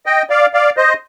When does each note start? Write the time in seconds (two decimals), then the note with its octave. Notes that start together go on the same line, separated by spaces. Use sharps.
0.06 D#5 G5
0.30 D5 F5
0.54 D5 F5
0.77 C5 D#5